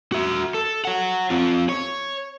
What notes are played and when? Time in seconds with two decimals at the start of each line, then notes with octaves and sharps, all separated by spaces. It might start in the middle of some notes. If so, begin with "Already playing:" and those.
0.12 F#4 E5
0.54 A4
0.85 C#5 F#5
1.30 C4 F4
1.69 C#5